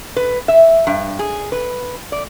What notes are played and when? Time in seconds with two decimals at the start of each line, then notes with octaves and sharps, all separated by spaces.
0.16 B4
0.48 E5
0.87 G2
1.19 G#4
1.52 B4
2.12 D5